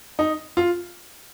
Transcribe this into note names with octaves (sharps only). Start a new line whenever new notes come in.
D#4
F4